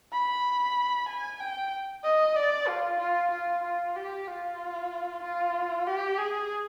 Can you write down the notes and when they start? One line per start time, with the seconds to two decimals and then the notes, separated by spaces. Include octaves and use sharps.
0.13 B5
1.09 G#5
1.40 G5
2.04 D#5
2.36 D5
2.68 F4
3.00 F4
3.31 F4
3.63 F4
3.96 G4
4.27 F4
5.23 F4
5.87 G4
6.18 G#4